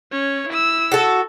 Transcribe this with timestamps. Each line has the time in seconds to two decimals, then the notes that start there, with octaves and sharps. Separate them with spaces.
0.12 C#4 C#5
0.49 E4 E6
0.92 F#4 A4